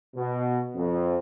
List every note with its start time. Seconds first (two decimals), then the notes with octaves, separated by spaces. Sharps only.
0.16 B2
0.75 F2